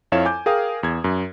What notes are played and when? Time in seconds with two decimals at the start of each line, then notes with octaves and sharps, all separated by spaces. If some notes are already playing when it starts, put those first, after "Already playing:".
0.12 F2 E4 C#5 F5 E7
0.25 G#5 D6 G6
0.46 G#4 A#4 F5 G5 D#6
0.83 E2 G#6
1.04 F#2